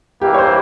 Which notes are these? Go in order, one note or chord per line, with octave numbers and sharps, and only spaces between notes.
G2 E3 G3 A#3 G4
C#5
C5